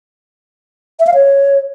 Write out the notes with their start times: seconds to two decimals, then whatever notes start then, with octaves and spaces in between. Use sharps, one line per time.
1.00 E5
1.07 F5
1.14 C#5